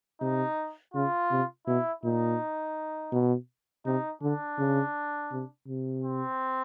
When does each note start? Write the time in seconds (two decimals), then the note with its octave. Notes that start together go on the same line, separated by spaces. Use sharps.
0.21 C3 D#4
0.94 C#3 F4
1.31 C3
1.67 B2 E4
2.04 A#2 D#4
3.12 B2
3.86 C3 D#4
4.22 D3 D4
4.58 C#3
5.32 C3
5.68 C3
6.04 C4